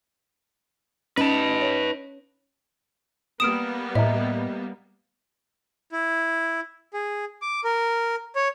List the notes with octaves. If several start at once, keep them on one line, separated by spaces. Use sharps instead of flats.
C#4 D#4 B4 A5
C#5
G3 A#3 B3 D#6 F6 D7 E7
A2 D#5 E5 A#5
E4
G#4
D6
A#4
C#5